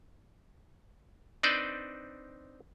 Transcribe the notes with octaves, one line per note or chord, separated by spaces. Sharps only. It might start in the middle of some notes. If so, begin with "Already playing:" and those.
C4 D4 D#4 B4 C5 D5